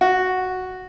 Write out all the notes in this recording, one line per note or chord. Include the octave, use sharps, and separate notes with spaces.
F#4